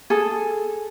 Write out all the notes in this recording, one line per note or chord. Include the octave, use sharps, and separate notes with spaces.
G#4 A4